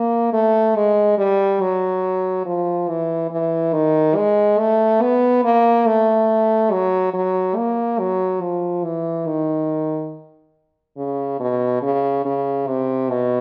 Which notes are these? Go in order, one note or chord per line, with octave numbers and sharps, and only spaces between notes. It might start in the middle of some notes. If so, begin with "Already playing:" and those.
Already playing: A#3
A3
G#3
G3
F#3
F3
E3
E3
D#3
G#3
A3
B3
A#3
A3
F#3
F#3
A#3
F#3
F3
E3
D#3
C#3
B2
C#3
C#3
C3
B2